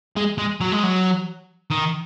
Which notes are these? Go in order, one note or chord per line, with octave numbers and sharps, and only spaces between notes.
G#3
G#3
F#3
G#3
F#3
D#3